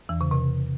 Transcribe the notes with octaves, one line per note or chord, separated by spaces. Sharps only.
E2 E3
C#3
C3